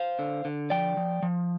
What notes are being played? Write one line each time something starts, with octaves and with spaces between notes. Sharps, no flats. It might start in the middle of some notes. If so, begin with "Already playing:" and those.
Already playing: C5 F5
D3
D3
F3 D5 G5
F3
F3